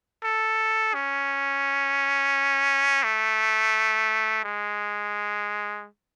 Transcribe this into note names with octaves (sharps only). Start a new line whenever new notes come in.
A4
C#4
A3
G#3